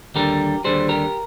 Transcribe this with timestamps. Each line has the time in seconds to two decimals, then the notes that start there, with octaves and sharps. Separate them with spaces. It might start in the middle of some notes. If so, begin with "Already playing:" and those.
0.15 D#2 D3 G3 G4 A#4
0.64 D#2 D3 G3 G#4 C5
0.89 G4 A#4